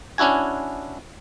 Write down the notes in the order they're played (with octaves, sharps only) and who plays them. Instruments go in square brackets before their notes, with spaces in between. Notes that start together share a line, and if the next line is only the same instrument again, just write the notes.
[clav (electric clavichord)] C#4 D4 E4 F#4 G#5